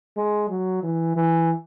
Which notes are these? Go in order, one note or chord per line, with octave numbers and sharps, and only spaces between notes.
G#3
F#3
E3
E3